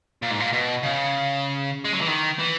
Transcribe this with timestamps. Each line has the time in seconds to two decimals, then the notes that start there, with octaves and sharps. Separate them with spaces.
0.22 A#2
0.30 G#2
0.40 A#2
0.53 B2
0.83 C#3
1.85 G#3
1.93 F#3
2.01 E3
2.08 D#3
2.39 E3